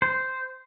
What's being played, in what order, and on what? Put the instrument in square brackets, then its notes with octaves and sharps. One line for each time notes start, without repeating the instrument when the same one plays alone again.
[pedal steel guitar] C5